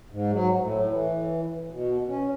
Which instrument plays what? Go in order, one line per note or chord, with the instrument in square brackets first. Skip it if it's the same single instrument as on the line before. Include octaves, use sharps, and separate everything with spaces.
[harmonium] G#2
F#3
A2
E3
B2
C#4